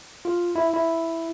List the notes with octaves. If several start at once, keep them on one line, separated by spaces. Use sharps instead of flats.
F4
E4
E4